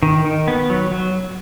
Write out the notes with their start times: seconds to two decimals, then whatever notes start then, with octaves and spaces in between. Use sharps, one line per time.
0.03 D#3
0.25 D#3
0.48 B3
0.70 F#3
0.92 F#3